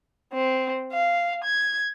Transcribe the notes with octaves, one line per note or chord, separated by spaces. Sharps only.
C4
F5
G#6